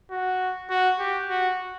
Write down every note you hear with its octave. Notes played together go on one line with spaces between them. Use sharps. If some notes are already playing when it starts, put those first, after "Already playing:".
F#4
F#4
G4
F#4